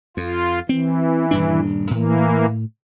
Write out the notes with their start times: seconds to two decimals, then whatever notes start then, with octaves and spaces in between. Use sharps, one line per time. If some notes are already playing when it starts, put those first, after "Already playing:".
0.17 F2 F4
0.69 E3 C4
1.31 D#1 G2 D4
1.91 A2 E3 A#3